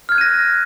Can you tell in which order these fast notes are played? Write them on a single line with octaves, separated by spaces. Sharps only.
F6 G#6 F#6 D#7 A#6